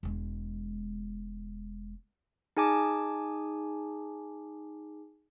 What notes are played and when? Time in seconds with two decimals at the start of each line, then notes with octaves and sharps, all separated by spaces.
0.03 E1 G#3
2.57 D#4 G#4 G#5 A5 D6